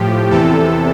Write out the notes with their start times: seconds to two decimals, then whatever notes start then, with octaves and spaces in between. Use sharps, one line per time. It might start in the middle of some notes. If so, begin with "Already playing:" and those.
Already playing: A2 F3 G4
0.30 E2 C3 E3 A4